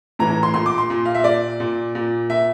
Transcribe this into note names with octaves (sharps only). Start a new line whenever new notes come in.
A2 E3 A#5
A#5
C6
A#2 C6
D6
C6
A#2
F5
E5
A#2 D5
A#2
A#2
A#2 E5